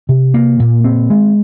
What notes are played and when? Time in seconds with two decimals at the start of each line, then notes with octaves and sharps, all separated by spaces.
0.09 C3
0.34 A#3
0.60 A#2
0.84 C4
1.10 G#3